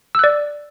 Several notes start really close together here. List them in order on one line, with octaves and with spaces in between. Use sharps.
E6 F#6 D5